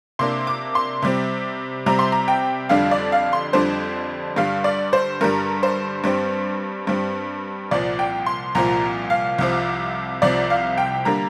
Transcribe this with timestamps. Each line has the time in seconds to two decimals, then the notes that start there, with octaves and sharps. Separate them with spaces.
0.19 C3 A#3 D4 C6
0.47 D6
0.75 C6
1.02 C3 G3 C4
1.86 C3 G3 C4 A#5
1.99 C6
2.12 A#5
2.28 G5
2.69 F2 D3 G3 D4 F5
2.91 D5
3.12 F5
3.33 C6
3.53 F2 D3 G3 D4 C5
4.36 G2 D3 G3 F5
4.64 D5
4.93 C5
5.21 G2 D3 G3 A#4
5.63 C5
6.04 G2 G3 C4
6.87 G2 G3 C4
7.71 C2 A#2 F3 D5
7.99 G5
8.26 C6
8.55 C2 A#2 F3 A#5
9.10 F5
9.39 C2 C3 F3
10.22 C2 C3 F3 D5
10.50 F5
10.78 G5
11.05 D3 G3 A#3 A#5